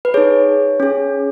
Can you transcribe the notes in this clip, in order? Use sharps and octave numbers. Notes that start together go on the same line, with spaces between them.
B4
D#4 G#4 C#5
C#4 G#4